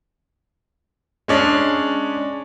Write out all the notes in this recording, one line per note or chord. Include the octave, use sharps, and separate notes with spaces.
G#3 C#4 D4